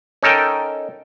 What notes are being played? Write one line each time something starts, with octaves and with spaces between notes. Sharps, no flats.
C#4 D#4 A4 A#4 G5